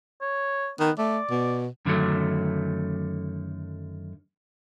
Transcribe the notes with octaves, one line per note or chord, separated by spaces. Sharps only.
C#5
D#3 B3
A3 D5
B2
F#2 D3 D#3 F#3 G#3 A3